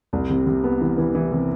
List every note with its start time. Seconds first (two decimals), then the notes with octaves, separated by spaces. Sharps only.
0.13 C2
0.30 C3
0.47 C3
0.64 B3
0.81 E3
0.98 E3
1.15 E3
1.32 C3